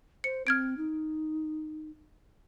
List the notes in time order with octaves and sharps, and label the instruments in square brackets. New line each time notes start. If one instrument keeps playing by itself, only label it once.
[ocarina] C5 [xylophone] C#7
[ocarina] C4 [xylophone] F6 G#6 D7
[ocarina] D#4